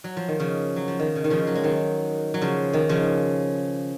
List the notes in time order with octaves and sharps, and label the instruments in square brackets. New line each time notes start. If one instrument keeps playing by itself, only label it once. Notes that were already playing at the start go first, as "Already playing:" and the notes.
[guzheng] F#3
F3
D#3
C#3 F3
F#3
F3
D#3
C#3
D#3
C#3 F3
F#3
G#3
D#3 F#3
F#3
C#3 F3
D#3
C#3 F3